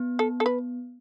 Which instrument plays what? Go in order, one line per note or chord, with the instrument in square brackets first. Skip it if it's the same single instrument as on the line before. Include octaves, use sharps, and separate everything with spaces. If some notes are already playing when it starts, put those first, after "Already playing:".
Already playing: [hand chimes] B3
[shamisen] A4
A4
B4